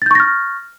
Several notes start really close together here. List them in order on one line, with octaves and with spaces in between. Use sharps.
A6 G6 C#6 A#6 F6